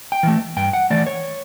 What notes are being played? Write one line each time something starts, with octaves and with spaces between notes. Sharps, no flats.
G5
E3 A3
G2 G5
F#5
E3 A3 D5
C#5